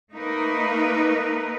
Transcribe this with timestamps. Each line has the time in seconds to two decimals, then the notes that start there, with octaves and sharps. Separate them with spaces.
0.12 A3 A#3 D#4 A#4 B4